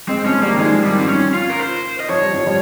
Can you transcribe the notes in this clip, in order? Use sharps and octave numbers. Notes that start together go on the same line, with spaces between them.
G#3 C4
F3 C#4
G3 A#3
D#3
F3 G#3
F3
D#3 G3
D#3 C4
C#4
F4
A#4
C5
D#5
F3 C#5
G3
F3
G3